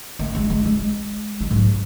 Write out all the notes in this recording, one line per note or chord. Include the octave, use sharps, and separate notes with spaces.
A#3
G#3
G#3
G#3
F#3
G#2